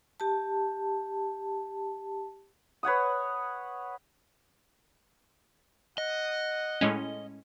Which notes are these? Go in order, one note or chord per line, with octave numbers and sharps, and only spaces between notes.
G4 A5
B4 C#5 F#5 D#6
D#5 F#5
A2 G#3 C#4